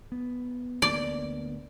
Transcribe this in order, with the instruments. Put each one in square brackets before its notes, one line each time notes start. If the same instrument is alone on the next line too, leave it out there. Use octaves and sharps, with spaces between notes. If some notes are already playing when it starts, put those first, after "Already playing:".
[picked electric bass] B3
[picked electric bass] D2 A#3 B3 [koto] D5